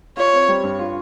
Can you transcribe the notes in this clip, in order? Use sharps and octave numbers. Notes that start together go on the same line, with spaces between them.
F4 C#5
C4
G3
G2
F4